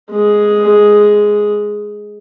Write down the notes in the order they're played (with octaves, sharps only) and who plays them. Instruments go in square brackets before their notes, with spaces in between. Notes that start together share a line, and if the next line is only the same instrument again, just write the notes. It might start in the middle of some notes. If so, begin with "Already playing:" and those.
[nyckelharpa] G#3 G#4